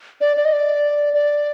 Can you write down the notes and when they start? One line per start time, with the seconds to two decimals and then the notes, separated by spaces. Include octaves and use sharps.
0.21 D5
0.37 D5
0.45 D#5
0.53 D5
1.14 D5